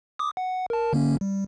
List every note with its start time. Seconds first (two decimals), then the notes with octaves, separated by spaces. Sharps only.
0.19 D6 D#6
0.37 F#5
0.70 A#4 A5
0.93 D3 A#3 C#4
1.21 G3